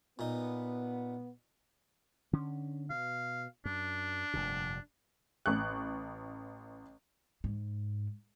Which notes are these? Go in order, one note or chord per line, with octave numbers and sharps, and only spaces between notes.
A#2 B3 D#4
D3 C#4
B2 F5
F#2 D4
F1 G2 A#2
A1 C#6 F#6
G#2